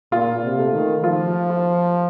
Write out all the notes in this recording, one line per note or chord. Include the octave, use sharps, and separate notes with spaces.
A#2 F4
C3
A3
D#3
F3 F4
F4